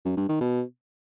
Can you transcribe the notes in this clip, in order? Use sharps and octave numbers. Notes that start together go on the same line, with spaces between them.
F#2
G2
D#3
B2